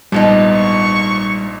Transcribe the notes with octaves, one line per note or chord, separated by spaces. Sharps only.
A#1 G#2 F3 G3 B3 D#4
C#6